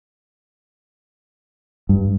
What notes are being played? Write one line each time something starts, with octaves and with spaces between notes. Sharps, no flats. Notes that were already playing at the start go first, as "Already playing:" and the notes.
G2